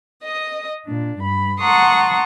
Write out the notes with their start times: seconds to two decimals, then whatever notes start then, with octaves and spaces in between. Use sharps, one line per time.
0.23 D#5 D#6
0.86 A#2 D4
1.19 G2 B5
1.60 F#5 A5 A#5 C6 C#6 D#6